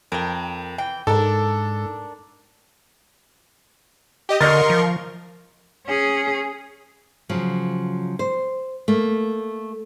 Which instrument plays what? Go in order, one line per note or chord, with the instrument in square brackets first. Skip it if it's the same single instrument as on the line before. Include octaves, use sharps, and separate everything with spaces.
[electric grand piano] F2 [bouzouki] A#4 G5
[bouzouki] E3 G5
[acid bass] G#2 [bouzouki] D4 A#4 [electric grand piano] A4
[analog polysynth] G4 D#5
[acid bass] D3 [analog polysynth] A#4 C6 C#6 [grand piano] D#5 F6 A6
[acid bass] F3
[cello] C#4 G#4
[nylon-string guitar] C#3 F3 F#3
C5
A3 A#3